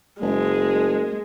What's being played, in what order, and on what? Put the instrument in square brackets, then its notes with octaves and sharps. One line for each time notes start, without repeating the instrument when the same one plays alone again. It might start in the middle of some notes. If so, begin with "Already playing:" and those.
[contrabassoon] F#1 [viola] G#3